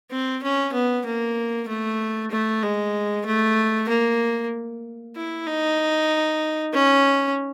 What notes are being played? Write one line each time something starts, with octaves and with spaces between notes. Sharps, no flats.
C4
C#4
B3
A#3
A3
A3
G#3
A3
A#3
E4
D#4
C#4